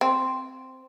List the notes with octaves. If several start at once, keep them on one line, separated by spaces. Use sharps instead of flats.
C4